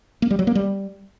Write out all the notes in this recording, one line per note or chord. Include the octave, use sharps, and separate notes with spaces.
A#3
G3
F#3
A#3
G3